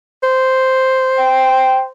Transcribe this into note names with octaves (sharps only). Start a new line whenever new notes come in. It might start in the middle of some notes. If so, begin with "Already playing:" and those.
C5
G5